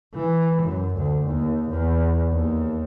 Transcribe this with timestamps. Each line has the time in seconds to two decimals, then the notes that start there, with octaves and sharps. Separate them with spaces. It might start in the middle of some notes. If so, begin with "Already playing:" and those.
0.14 E3
0.62 F#2
0.96 D2
1.27 D#2
1.70 E2
2.31 D#2